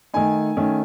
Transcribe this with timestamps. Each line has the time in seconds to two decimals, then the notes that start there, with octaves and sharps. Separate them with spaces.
0.14 D#3 A3 D#4 G#5
0.57 D#3 A3 C#4